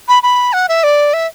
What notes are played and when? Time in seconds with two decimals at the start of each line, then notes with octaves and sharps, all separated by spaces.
0.08 B5
0.23 B5
0.53 F#5
0.68 E5
0.83 D5
1.13 E5